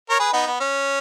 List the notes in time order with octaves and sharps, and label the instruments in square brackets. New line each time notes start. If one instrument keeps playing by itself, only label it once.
[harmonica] A#4 C#5
G#4 B4
B3 D#4
B3
C#4